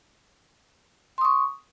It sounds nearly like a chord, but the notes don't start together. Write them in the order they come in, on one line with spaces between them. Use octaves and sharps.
C6 D#6 C#6